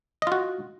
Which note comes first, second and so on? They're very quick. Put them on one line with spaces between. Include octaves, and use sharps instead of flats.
D#5 F4 F#4